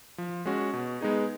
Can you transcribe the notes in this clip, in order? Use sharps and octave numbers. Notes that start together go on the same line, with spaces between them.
F3
G#3 C#4 F#4
B2
G#3 B3 D#4 G#4